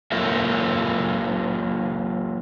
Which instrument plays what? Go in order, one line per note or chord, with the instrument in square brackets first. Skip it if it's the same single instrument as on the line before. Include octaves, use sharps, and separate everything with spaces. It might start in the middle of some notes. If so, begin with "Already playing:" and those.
[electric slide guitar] F#3 A#3 F4 A4 A#4 E5